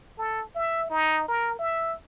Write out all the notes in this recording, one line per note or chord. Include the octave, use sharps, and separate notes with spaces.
A4
E5
D#4
A#4
E5